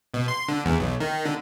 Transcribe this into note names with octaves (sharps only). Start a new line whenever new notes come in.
B2
C6
D3
E2
B1
D#3
D3